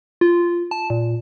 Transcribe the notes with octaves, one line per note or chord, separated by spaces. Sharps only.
F4
A5
A#2